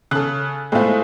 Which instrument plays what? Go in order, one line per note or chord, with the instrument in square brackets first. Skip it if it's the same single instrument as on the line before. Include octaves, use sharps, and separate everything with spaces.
[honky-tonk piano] C#3 [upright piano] A4 F#6
[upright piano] A2 C4 F4 [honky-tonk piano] G#3 A3